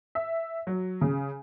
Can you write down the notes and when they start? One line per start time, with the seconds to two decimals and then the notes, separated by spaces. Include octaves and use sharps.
0.15 E5
0.67 F#3
1.01 C#3